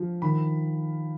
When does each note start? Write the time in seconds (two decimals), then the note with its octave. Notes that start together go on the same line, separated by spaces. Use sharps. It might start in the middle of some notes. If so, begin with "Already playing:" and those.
Already playing: F3
0.22 D#3 B5